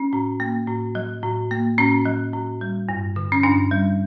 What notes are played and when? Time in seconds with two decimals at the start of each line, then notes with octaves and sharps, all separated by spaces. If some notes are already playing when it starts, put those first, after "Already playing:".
Already playing: C#4
0.13 A2
0.40 A#3
0.68 A2
0.95 F#3
1.23 A2
1.51 A#3
1.78 A2 C#4
2.06 F#3
2.33 A2
2.61 G3
2.89 G2
3.16 D3
3.32 C#4
3.43 G2 D4
3.71 G3